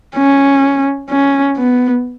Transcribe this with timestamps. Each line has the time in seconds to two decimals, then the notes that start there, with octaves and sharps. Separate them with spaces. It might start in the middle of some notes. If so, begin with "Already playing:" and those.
0.16 C#4
1.10 C#4
1.57 B3